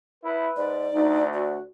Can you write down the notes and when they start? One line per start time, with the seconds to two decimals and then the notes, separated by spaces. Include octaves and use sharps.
0.24 E4 B4
0.56 G#2 D5
0.94 D2 D#4
1.33 F#4 D5